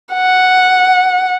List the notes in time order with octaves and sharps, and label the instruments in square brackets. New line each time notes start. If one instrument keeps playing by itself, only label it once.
[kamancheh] F#5